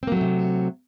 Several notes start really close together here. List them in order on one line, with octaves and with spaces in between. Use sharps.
C4 A#3 F#3 A3 C3